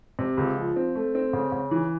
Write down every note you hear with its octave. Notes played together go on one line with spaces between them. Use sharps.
C3
C#2
F3
C4
A3
C4
C#3
C#3
E3